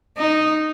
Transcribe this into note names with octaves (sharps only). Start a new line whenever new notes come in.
D#4